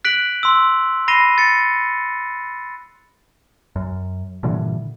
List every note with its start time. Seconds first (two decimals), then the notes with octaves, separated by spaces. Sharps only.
0.05 F#6 B6 D7 F#7
0.43 C6 E6
1.08 B5 A#6 C7 D#7 G7
1.38 A6 C#7
3.76 F#2
4.43 G2 A#2 D3 E3